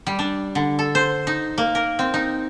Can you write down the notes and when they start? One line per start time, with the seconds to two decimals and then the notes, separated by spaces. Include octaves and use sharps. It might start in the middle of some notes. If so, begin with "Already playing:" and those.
0.07 G3
0.19 D4
0.55 D3
0.79 A4
0.95 C5
1.27 D#4
1.58 A#3
1.75 A#4
1.99 C4
2.14 D#4